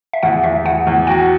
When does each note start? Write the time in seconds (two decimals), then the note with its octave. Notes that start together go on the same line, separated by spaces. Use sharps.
0.13 E5
0.23 E2 F#5
0.44 E2 E5
0.65 E2 F#5
0.87 E2
1.07 F#4 G5